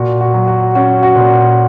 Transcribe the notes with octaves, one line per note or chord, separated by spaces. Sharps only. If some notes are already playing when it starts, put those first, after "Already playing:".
Already playing: A#2 F#4
F#4
F#3
F#4
C#4 F#4
F#4
A#2